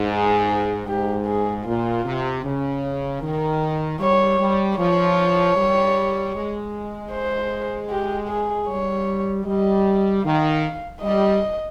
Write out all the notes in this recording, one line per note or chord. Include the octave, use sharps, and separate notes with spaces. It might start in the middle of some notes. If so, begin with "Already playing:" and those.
Already playing: G#2
G#4
G#2 G4
G#4
A#2 F4
C3
C#3
D#3 A#4
G3 C#5
G3
F3 C#5
G3
G#3
C5
G4
G#4
G3 C#5
G3 D#5
D#3 F5
G3 D#5